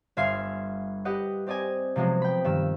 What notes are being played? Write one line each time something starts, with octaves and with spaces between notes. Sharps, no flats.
G1 E5 F5 G#5 C6 C7
G4 B4 D#5 F#5
C4 G4 D5 D#5 G#5
C3 F3 F#3 G#3 B3
G5 B5
G2 D#3 E6